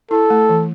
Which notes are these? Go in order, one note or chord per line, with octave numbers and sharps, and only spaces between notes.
E4 A4
A3
E3